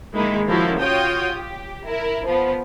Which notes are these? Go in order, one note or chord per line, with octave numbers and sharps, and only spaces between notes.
D#3 G#3 A#3 D#4 E4
C#3 F3 E4 F#4 A4 A#4
F4 F#4 C#5 G5 D#6
G4
E4 A#4
F3 B3